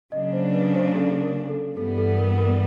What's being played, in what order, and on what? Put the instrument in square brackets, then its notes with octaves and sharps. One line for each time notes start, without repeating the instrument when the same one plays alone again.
[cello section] C#3 F#3 A#3 D4 [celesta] D#5
[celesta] C5
B4
C5
A4
A#4
A4
[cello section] G2 E3 G3 B3 [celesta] A4
[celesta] A4
A#4
A#4